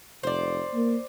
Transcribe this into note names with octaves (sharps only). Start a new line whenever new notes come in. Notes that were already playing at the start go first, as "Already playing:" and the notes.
F1 C5 D5
A#3